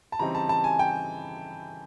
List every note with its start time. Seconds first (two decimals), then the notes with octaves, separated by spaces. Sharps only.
0.12 A5
0.19 C#3 E3 G3 C4 D#4 A#5
0.35 A5
0.49 A5
0.64 G#5
0.79 G5